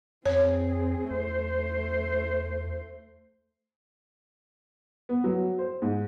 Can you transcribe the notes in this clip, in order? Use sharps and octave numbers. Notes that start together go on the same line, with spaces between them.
F2 C4 G#4 C#5
E2 A3 C5
B3
F#3
C5
G#2